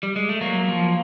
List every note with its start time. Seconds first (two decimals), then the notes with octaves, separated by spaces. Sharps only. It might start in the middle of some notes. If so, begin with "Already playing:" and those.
0.03 G3
0.16 G#3
0.29 A3
0.41 F#3 A#3
0.68 F3